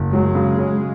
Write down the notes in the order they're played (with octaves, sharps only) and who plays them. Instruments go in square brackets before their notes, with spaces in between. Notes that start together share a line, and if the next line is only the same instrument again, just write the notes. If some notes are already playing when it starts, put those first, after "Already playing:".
Already playing: [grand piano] F#1
[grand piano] F#3 [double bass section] G#3
[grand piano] C#3
C#3